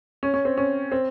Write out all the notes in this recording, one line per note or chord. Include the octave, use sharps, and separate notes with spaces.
C#4
C#4
C4
C#4
C4